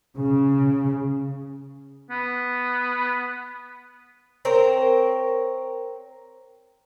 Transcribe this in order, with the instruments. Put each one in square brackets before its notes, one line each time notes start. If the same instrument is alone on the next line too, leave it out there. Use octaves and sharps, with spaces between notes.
[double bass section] C#3
[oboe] B3
[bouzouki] C4 A#4 C5 C#5